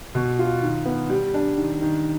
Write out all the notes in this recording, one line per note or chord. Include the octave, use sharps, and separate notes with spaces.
B2
F4
D#3
B3
G3
D4
D#3
D#3